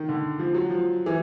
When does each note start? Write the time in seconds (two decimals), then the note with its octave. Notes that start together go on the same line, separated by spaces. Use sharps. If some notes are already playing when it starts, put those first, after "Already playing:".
Already playing: D#3
0.09 D3
0.39 F3
0.54 F#3
0.70 F3
1.06 E3